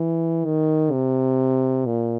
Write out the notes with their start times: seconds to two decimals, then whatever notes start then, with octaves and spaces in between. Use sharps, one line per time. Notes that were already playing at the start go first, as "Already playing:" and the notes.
Already playing: E3
0.45 D#3
0.92 C3
1.86 A#2